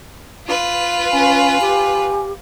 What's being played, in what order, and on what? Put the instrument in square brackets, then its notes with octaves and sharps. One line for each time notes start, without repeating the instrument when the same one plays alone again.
[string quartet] F4 B4
[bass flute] C#4 [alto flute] G#5
[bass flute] G4